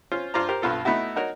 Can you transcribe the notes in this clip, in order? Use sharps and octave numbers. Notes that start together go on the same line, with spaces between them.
C#4 F4 C5
G2 F4 C5 D5 A#5
G4 A#4 C5
B1 G2 B3 F4 A4
A3 B3 D#4 E4 F#4
D#4 F#4 A#4 C#5